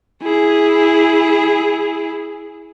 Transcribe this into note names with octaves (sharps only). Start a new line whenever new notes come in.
E4 G#4